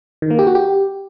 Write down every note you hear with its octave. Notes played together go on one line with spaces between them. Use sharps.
D#3
A#3
G4
F#4
G4